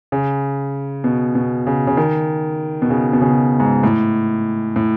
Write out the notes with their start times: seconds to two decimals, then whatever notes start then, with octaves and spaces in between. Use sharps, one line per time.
0.12 C#3
1.04 B2
1.35 B2
1.67 C#3
1.87 C#3
1.97 D#3
2.82 B2
2.90 C#3
3.13 B2
3.21 C#3
3.29 B2
3.60 G#2
3.83 A2
4.76 A2